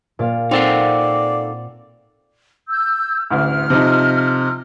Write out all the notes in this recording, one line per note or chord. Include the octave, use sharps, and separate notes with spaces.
A#2 D5 F5
C4 D#4 A4 D5 F5 F#5
E6 G6
A1 D2 F6
C3 F3 D#4